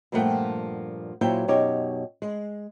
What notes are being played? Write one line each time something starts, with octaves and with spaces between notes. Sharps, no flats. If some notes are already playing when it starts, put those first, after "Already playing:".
G2 A#2 F3 A3 F#5 G5
A#2 F#3 E4 C5 E5 G5
F#2 B2 D#4 G4 C#5
G#3